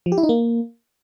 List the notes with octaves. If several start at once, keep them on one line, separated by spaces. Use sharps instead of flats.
F3
G4
E4
D#4
A#3